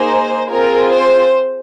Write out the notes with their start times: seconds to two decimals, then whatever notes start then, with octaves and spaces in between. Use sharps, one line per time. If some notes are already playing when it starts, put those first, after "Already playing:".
Already playing: A#3 D#4 G#4 C5
0.50 C4 F4 G#4 A#4
0.92 C5